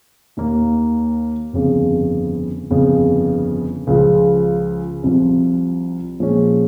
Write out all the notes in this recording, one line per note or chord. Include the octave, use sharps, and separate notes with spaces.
D#2 D#3 A#3
G1 F2 C#3
G1 F2 C#3
C#2 C#3 F3
C2 C3 F3
A#2 F3 G#3 C#4 G#4